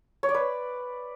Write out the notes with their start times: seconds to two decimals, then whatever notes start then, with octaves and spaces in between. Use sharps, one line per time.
0.23 C#5
0.29 D5
0.34 B4